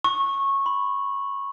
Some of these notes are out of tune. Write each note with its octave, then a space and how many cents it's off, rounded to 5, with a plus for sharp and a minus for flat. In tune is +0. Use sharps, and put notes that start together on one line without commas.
C#6 -15
B5 +20